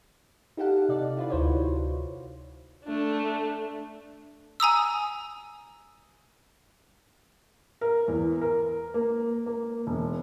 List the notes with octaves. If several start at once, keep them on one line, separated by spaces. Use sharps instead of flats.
D#4 G4 A4 F5 F#5
C3 D#4 D5
E4 F4 B4
D2 F#4 C5 C#5
A3 D4
G#5 A#5 D#6 E6
A#4
E2
A#4
A#3
A#3
E1